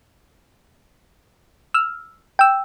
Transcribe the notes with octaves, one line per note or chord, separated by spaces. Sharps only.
E6 F6
G5 E6